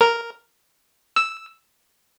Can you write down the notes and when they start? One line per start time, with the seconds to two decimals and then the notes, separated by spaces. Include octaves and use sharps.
0.01 A#4
1.16 E6